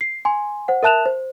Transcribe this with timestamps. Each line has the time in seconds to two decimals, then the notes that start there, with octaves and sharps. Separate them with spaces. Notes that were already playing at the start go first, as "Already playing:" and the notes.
0.01 C7
0.25 G#5 C6
0.68 C5 F#5
0.83 A#4 E5 A5 F#6 E7 F7
1.06 C5